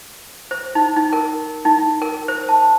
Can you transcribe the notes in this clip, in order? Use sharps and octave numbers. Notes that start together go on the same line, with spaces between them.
C5
D#4
D#4
A#4
D#4
A#4
C5
A5